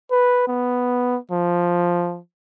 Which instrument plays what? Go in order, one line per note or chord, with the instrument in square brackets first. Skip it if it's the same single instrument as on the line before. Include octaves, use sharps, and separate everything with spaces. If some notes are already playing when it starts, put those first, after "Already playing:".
[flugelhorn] B4
B3
F3